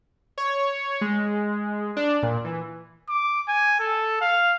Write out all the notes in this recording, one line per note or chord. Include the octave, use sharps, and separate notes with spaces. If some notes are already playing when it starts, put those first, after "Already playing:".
C#5
G#3
D4
A#2
E3
D6
G#5
A4
F5